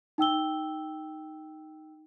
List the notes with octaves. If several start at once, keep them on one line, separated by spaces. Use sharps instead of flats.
D#4 G5 E6 G7